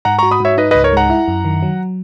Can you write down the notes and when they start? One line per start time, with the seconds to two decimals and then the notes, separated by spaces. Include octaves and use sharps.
0.05 G#2 F#5 A#5
0.19 F#4 A#5 C#6
0.31 B5 D#6
0.40 G#2 C#5 E5
0.57 D#4 B4 D#5
0.71 C#2 B4 D#5
0.84 A#4 C#5
0.93 G#3 F#5 A#5
1.10 E4
1.28 F#2
1.45 D#3
1.63 F#3